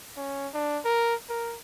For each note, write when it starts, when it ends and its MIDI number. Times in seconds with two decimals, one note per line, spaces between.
0.17 0.48 61
0.54 0.79 62
0.85 1.15 70
1.29 1.56 70